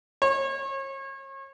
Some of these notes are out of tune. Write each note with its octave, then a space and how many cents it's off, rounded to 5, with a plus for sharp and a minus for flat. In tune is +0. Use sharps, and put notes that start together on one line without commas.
C#5 -40